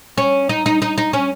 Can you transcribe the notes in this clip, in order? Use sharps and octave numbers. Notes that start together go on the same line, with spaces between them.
C#4
D#4
D#4
D#4
D#4
C#4